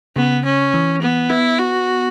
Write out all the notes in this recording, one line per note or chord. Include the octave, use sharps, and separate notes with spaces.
C#3 B3
C#4
E3
B3
B3 E4
F#4